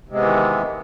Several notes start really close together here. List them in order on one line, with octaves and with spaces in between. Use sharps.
C3 G#3 B3 E3 D#3